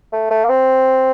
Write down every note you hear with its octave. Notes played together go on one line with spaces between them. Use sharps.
A3
A3
A#3
C4